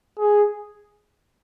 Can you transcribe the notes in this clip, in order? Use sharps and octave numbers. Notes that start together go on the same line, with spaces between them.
G#4